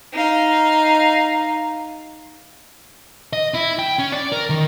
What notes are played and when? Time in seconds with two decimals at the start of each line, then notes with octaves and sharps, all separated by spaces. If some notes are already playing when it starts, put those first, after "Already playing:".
0.13 D#4 F5
3.33 D#5
3.54 E4
3.79 G5
3.99 C#4
4.12 D5
4.32 A#4
4.50 D#3